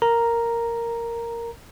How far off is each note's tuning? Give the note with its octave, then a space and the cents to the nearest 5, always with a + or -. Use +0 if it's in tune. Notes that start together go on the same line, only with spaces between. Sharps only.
A#4 -5 A#5 +0